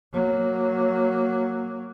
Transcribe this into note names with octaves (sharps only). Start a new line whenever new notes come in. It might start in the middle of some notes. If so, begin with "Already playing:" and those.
F#3 A#3